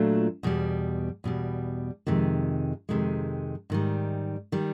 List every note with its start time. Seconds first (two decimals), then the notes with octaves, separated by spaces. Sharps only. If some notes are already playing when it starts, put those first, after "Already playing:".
Already playing: A#2 F#3 A3 D4 F4
0.43 E2 B2 G3
1.24 E2 B2 G3
2.07 F2 C3 D#3 G#3
2.89 F2 C3 D#3 G#3
3.70 G#2 D#3 G3
4.52 D#3 G3